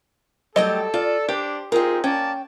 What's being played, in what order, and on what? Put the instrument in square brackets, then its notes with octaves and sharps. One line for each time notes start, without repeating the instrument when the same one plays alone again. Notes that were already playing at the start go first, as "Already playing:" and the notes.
[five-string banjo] F#3 G3 D#5 [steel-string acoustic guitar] A3 G4 G5 [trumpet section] A4
[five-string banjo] F4 [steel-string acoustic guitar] D5
[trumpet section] D4 [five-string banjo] G4 [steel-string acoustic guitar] C5
[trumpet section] C4 D#4 G#4 [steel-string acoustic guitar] F4 G4 [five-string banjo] A#4
[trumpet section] A#3 D5 A5 [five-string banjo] C#4 [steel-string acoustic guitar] G5